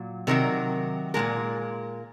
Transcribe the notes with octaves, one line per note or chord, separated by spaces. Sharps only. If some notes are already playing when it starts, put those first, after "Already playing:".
Already playing: A#2 F#3
C3 D#3 F#3 A#4
A#2 F3 G#3 A#4